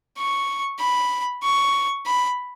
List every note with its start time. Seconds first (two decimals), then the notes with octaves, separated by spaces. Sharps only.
0.17 C#6
0.79 B5
1.43 C#6
2.05 B5